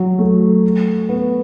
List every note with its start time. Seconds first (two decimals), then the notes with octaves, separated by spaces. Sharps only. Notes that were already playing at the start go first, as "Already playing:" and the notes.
Already playing: F#3
0.19 A3
1.09 B3